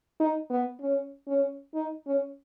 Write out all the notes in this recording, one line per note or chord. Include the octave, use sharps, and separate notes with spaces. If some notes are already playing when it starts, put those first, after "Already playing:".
D#4
B3
C#4
C#4
D#4
C#4